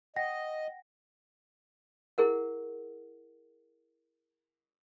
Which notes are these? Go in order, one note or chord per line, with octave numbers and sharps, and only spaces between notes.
D#5 F#5 G5 A#6
E4 G#4 A#4 F#5